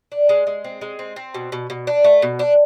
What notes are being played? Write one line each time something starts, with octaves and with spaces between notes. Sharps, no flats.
D4
G#3
G#3
C4
G#3
C4
C4
B2
B2
B2
D4
A3
B2
D4